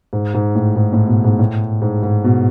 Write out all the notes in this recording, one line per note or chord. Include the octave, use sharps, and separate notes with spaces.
G#2
G#2
A2
G#2
A2
B2
G#2
A2
G#2
G#2
B2